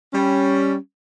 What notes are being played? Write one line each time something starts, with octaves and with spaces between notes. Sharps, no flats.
G3 C#4